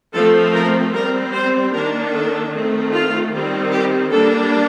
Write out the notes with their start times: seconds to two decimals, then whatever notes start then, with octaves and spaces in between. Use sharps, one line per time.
0.14 F3 A3 C4 A4
0.54 A#4
0.94 G3 C4 A#4
1.33 C5
1.73 D#3 A#3 D4 A#4
2.13 A4
2.52 D#3 A3 C4
2.92 F4
3.32 D#3 G3 C4
3.71 G4
4.11 G3 A#3 D4 A4